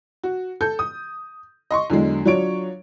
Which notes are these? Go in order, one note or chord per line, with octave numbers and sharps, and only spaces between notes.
F#4
A4 G6
D#6
D#5 C6 C#6
E2 D3 F#3 G#3
F#3 D4 F4 C#5 D7